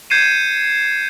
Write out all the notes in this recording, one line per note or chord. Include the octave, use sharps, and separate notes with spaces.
G6 G#6 C7 C#7 D#7 E7